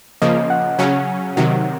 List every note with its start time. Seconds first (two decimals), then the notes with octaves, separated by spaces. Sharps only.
0.22 C#3 F3 A#3 D#5
0.50 F#5
0.79 C#3 F#3 C#4
1.36 C3 D#3 F#3 F#5